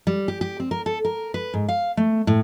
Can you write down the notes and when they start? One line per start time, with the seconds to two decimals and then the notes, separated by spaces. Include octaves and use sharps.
0.07 G3
0.28 G4
0.41 G4
0.60 C4
0.71 A#4
0.86 A4
1.05 A#4
1.34 B4
1.54 G#2
1.69 F5
1.97 A3
2.27 A2